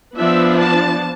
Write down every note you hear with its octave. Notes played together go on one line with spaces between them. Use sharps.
F3 B3 D4 E5
A5